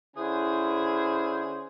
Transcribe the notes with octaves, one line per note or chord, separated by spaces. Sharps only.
D3 C#4 E4 G#4 C5 G#5